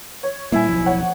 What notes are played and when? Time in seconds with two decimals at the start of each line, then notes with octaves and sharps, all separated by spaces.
0.23 C#5
0.52 A#2 G3 A#3 E4 E5 G#5
0.68 D1 B1 F3
0.86 C#5 F#5